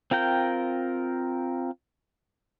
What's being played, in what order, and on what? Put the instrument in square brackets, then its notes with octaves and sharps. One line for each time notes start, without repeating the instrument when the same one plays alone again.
[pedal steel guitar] C4 F4 A#4 G5